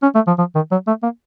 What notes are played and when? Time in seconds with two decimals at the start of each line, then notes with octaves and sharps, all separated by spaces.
0.03 C#4
0.15 A3
0.27 F3
0.38 F3
0.55 D#3
0.72 F#3
0.87 A3
1.03 A#3